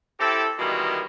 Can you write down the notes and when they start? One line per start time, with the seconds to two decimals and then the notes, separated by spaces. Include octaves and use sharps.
0.19 C4 E4 G4 A4
0.58 B2 D#3 E3 G3 G#3 A#3